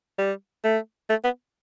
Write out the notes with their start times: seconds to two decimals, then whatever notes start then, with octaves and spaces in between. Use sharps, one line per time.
0.19 G3
0.64 A3
1.10 A3
1.24 B3